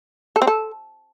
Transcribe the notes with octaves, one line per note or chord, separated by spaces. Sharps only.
A4
C4
A4